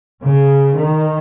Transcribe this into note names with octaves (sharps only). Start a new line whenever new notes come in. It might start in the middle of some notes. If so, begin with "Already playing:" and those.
C#3
D#3